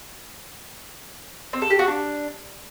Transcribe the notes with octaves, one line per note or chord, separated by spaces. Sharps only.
C4
A4
G4
F#4
D4